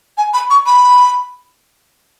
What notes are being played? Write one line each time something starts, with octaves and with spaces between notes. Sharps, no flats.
G#5
B5
C#6
B5